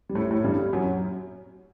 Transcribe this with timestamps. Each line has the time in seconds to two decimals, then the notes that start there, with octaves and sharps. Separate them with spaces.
0.09 G3
0.15 A2 A3
0.31 A2 A3
0.44 G2 G3
0.73 F#2 F#3